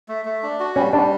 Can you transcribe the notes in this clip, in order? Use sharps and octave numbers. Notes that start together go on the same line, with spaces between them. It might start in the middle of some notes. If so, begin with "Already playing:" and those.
A3
A3
D4
F#4
G3 C#4
G3 D4